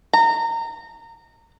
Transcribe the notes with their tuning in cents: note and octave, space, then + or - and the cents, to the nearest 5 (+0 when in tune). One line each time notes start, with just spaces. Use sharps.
A#5 -25